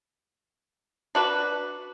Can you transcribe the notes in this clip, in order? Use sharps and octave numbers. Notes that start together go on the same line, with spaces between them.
D4 F#4 B4